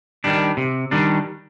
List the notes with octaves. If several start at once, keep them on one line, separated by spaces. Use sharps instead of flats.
D#3 G3 D4
C3
D#3 G3 D4